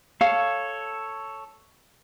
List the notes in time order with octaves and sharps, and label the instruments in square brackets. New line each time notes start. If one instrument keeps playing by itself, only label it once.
[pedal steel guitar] A4 C#5 [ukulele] F5